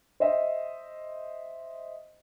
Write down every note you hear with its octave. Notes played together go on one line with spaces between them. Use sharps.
C5 D#5 E5